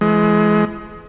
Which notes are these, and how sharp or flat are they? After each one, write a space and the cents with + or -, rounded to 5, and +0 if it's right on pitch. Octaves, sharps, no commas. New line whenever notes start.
E3 +35 G#3 +25